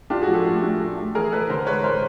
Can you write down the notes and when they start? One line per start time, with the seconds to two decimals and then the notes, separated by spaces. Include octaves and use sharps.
0.10 D4 F4 G4
0.22 F#4 G#4
0.28 F3
0.34 G4 A4
0.46 A3
0.63 D4
0.80 A3
0.97 A3
1.15 E3 G#4 A#4
1.32 E3 A4 B4
1.49 D3 A#4 C5
1.66 G#3 B4 C#5
1.84 G#3 A#4 C5